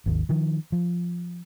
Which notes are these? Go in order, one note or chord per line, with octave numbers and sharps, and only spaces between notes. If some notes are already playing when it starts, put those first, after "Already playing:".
G#1 D#2
D#3 F3
F3